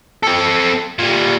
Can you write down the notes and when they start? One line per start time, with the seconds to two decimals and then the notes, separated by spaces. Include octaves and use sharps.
0.23 C4 A4
0.99 A#2 G3